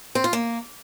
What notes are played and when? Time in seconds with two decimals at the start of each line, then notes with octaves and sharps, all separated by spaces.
0.15 C4
0.24 F4
0.33 A#3